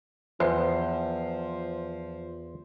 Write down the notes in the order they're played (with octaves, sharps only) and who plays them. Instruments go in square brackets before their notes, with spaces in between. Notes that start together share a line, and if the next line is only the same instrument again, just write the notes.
[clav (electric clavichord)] E2 [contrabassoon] F3 [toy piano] B4 [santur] C5